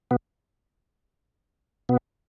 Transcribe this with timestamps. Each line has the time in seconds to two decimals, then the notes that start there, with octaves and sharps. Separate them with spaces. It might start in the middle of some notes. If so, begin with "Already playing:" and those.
0.11 B2 B3
1.89 B2 B3